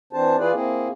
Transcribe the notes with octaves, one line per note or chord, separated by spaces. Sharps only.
E3 C4 D4 C5 A5
E3 E4 F4 G#4 B4 D5
A#3 C4 E4 G#4